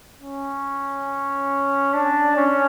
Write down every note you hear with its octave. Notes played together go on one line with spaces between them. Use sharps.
C#4
D4
C#4